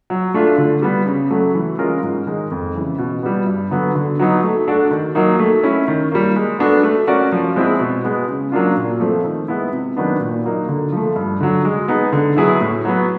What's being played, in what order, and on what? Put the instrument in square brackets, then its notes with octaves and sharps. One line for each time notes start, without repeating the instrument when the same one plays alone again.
[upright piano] F#3
A3 D4 F4
D3
G3 B3
C#3
F#3 A3
E3
G#3 C#4 F4 A#4
G#2
D#3 G#3
F2
C#3 E3
B2
G3 B3
G2
D3 F#3 B3
D3
F#3 B3 D#4
A3
D4 F#4 A4 D5
D#3
F#3 A#3 D#4
A3
C#4 E4
D#3
G3 A#3
G#3
B3 D4 F#4 A4
A3
C#4 F#4 A#4 D5
F3
G#3 C4 E4 G#4
B2
G#3 B3
C#3
F#3 A#3 D4 F4
A#2
F3 A3 C4
D#3
G#3 B3 E4
C3
D#3 F#3 B3 D4
A#2
F#3 A#3 D#4
D3
F3 A3
G2
D3 F#3
G#3
B3 D#4 G#4
D3
F#3 B3 E4 G#4
A2
F#3 B3